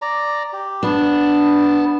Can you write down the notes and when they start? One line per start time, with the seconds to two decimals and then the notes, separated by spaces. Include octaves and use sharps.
0.02 D5 A#5
0.53 G4
0.83 B3 D4 A5